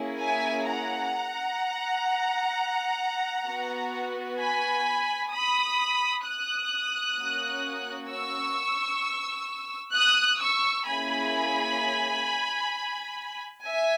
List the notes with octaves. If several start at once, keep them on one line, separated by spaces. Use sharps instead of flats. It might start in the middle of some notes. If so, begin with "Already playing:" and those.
Already playing: A#3 C#4 E4 G#4
E5 G#5
F#5 A#5
B3 F#4
G#5 B5
B5 D#6
D#6 F#6
A#3 C#4 F#4
C#6 E6
D#6 F#6
C#6 E6
A#3 C#4 E4 G#4 G#5 B5
E5 G#5